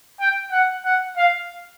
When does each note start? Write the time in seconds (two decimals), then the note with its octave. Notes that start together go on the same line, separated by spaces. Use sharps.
0.20 G5
0.51 F#5
0.84 F#5
1.17 F5